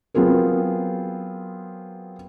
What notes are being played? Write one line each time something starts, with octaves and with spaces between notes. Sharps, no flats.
F#3 B3 C4 F4 G#4 A#4